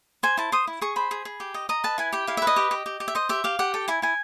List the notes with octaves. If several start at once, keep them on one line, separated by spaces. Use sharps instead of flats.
C5 G#5
E4 A5
C5 D#6
E4
G#4 C#6
C5 B5
G#4
G#4
G4
D#5
D#5 A#5
B4 A5
E4 G#5
G4 G5
E4 F5
E5
B4
D#5
G4
G4
G4
G4
E5
C5 D#5
G4 E5
G4 F5
G4 F#5
A4 G5
E4 G#5
E4 G#5